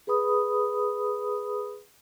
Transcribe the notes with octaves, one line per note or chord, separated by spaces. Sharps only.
G#4 B4 B5 D#6